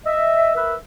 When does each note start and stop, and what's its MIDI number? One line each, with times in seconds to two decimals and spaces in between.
0.05 0.54 75
0.05 0.54 76
0.55 0.74 70
0.55 0.74 71
0.55 0.74 76